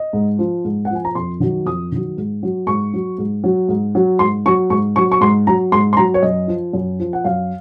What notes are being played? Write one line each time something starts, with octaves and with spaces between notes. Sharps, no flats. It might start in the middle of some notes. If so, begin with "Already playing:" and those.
Already playing: D#5
G#2
F3
G#2
F#5
F3 G#5
A#5
F2 C6
D#3 F#3
F2 D#6
D#3 F#3
G#2
F#3
G#2 C#6
F#3
G#2
F#3
G#2
F#3
G#2 C6
F#3 C#6
G#2 C#6
F#3 C#6
C#6
G#2 C6
F#3 A#5
G#2 C6
C6
F#3 A#5
C#5
F#2 D#5
F3
F#2
F3
F#5
F#2 F5